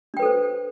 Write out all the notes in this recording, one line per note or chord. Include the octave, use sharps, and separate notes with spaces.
D4 A4 B4 C5 G5